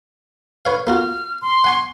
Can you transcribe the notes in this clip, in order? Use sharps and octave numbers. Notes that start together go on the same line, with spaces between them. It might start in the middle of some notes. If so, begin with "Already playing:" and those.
B4 C#5 F5
A#3 F4 F#4 F6
C6
F#5 G#5 C#6